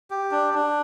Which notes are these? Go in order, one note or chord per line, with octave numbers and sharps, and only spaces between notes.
G4
D4
D4